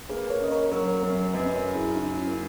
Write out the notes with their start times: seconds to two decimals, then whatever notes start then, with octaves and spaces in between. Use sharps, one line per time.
0.09 A#3 G#4 B4
0.30 A#4 C#5
0.40 C#3 D#5
0.51 A#4 C#5
0.72 F#3 A#4 C#5
0.87 A#4 C#5
1.03 F#2 A#4 C#5
1.34 F#2 B4 D#5
1.54 A#4 C#5
1.65 C#3
1.75 E4 G#4
1.95 C#3 D#4 F#4
2.16 C#4 E4
2.27 A#3